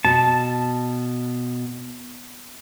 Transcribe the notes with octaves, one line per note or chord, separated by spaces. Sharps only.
B2 A5